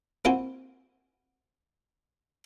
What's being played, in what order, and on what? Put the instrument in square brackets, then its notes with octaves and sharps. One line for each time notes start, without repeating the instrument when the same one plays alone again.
[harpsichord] A#3 C4 E4 F#4 C5 G#5